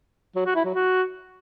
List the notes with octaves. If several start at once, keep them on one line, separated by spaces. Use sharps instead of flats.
F#3
F#4
E4
F#3
F#4